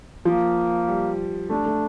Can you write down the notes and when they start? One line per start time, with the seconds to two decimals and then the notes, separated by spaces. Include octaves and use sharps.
0.25 F3 A#3
0.88 G3
1.49 A3 D4
1.66 A3